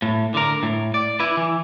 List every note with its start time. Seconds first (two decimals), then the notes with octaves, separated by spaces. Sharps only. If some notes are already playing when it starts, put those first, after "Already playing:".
0.02 A2
0.34 D3 A#4
0.63 A2
0.94 D5
1.20 E4 B4
1.37 E3